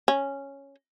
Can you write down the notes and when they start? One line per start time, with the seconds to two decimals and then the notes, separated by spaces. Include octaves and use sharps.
0.08 C#4